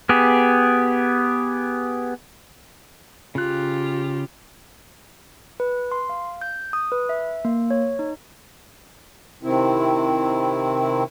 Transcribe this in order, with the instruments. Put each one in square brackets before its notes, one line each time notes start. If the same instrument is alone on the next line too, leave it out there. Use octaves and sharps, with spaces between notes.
[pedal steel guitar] B3 G4 G#4
[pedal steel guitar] C#3 F#6 [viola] F4 G4
[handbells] B4
C6
F5
G6
D#6
B4
E5
A#3
C#5
D#4
[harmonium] C3 D#3 C4 E4